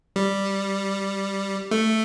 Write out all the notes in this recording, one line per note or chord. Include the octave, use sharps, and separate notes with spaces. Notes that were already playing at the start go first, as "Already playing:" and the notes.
G3
A3